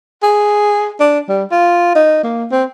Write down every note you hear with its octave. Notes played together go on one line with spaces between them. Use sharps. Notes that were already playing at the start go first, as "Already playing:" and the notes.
G#4
D4
G3
F4
D#4
A#3
C4